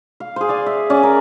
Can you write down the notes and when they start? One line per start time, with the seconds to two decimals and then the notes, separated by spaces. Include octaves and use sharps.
0.20 F5
0.36 G#4 C5
0.49 D5 F5 G#5
0.66 E5
0.90 C#4 D5
1.03 A#4